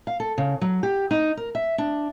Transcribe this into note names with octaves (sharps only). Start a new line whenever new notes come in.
F5
A4
C#3
F#3
G4
D#4
A#4
E5
D4